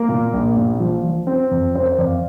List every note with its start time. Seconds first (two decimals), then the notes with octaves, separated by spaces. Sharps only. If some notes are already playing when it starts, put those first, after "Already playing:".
Already playing: A#3 A#4
0.09 A#2
0.33 A#1
0.57 A#2
0.80 F3
1.04 F3
1.27 C4
1.51 F2
1.75 C4 C5
1.84 A#4
1.92 C5
1.99 F2 D5
2.07 F5